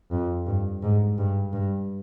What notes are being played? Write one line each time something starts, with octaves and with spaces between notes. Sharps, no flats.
F2
G2
G#2
G2
G2